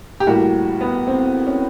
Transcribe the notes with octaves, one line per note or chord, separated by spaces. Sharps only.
G4
A2 E3 G3 A#3 F#4
B3
C4
C#4